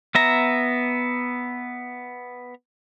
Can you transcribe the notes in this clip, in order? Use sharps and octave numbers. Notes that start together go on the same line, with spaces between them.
B3 E5 A#5